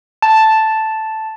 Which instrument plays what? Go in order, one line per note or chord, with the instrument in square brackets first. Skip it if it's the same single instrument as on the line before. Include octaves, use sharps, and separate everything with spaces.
[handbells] A5